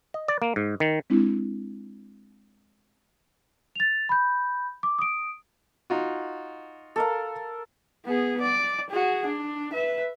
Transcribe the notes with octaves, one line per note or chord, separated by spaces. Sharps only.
D#5
D5
A#3
G#2
D#3
G#3 C4 D4 E4
A6 F7
B5 G6
D6
D#6 D7
D#4 F4 F#4
A4 A#4 F5
B3 G#4
D5
F#4 G#4
D4
B4 E5